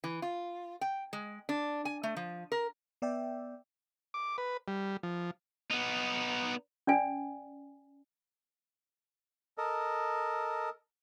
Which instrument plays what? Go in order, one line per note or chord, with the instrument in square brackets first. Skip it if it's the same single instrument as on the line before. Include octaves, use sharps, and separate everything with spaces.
[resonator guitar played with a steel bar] E3
F4
G5
G#3
D4
G#5
A3
F3
A#4
[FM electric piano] B3 D5 E5 G5
[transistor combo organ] D6
B4
G3
F3
[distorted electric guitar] B3 D#4
[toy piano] C#4 D5 G#5
[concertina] A4 A#4 D#5